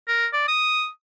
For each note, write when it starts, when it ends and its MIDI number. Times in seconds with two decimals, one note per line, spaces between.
0.08 0.26 70
0.33 0.43 74
0.48 0.88 87